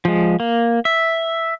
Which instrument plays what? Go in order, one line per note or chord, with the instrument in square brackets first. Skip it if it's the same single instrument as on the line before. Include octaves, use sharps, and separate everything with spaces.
[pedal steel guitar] F3 G#3
A#3
E5